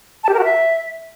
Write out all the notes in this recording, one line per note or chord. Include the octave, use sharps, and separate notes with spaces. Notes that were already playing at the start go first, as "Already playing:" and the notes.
A5
G4
A#4
F#4
E5